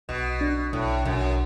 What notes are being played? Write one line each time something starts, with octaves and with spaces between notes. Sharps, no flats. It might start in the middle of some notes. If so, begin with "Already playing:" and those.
B1 B2
D4
B1 A2
B1 F#2